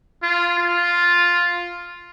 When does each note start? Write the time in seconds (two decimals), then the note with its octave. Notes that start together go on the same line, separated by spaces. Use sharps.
0.23 F4
0.58 F4